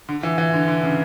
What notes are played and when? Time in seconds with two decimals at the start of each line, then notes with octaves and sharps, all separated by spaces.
0.09 D3
0.23 E3
0.38 E3
0.53 D3
0.68 D3
0.83 C#3